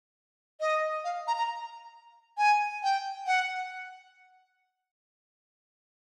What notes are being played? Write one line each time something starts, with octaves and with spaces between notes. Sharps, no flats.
D#5
F5
A#5
A#5
G#5
G5
F#5